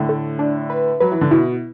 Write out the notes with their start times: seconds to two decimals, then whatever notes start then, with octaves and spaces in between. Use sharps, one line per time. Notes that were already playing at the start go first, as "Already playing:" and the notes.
Already playing: A2 D3
0.09 A3
0.39 D4
0.70 B4
1.00 F#3 B4
1.12 E3
1.21 D3
1.31 B2 E4